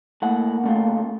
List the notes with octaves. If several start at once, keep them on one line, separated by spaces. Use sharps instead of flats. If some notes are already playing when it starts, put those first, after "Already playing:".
A2 A#3 F#5
C#3 A3 F4